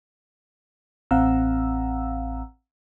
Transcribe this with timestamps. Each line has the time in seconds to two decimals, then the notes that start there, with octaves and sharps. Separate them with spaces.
1.11 A1 C4 F5 F#5 A#5 E6